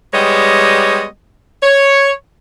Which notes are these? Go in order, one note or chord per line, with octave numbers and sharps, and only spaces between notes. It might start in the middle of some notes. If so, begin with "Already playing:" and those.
G3 G#3 B3 G4 C#5 D#5
C#5